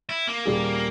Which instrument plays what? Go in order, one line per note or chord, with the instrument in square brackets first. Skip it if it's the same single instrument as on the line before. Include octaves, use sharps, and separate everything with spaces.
[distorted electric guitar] E4
A#3
[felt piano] D#1 G3 G#4